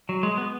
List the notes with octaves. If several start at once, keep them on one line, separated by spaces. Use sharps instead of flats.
F#3
G#3
B3